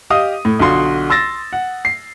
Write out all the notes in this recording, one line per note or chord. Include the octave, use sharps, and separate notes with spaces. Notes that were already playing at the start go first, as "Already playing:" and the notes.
G4 D#5 F5 D#6
A2
B1 D3 F4 F#4 C6
C6 E6 A6 A#6
F#5
C7